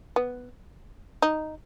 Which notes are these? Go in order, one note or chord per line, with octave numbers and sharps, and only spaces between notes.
B3
D#4